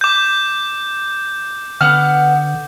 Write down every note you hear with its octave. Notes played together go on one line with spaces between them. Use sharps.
D6 G6
D3 B3 F#5 F6